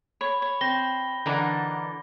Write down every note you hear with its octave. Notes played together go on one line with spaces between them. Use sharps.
C#5 B5
C#5
C4 A#6 G7
D3 E3 D4 D#4 A#4 F#5